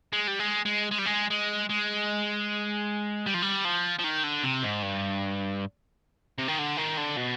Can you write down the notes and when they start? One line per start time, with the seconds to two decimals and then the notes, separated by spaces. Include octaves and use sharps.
0.13 G#3
0.28 G3
0.39 G#3
0.65 G#3
0.92 G#3
0.99 G3
1.06 G#3
1.30 G#3
1.69 G#3
3.26 G3
3.34 F3
3.42 G3
3.65 F3
3.99 F3
4.04 D#3
4.24 D3
4.43 C3
4.63 G#2
4.82 G2
6.38 C3
6.48 D#3
6.59 D3
6.77 D#3
6.98 D3
7.17 B2